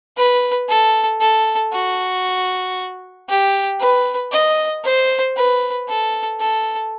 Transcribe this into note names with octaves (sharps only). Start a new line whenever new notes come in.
B4
A4
A4
F#4
G4
B4
D#5
C5
B4
A4
A4